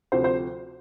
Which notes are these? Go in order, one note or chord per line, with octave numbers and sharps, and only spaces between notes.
D2 C3 F3 C5
C5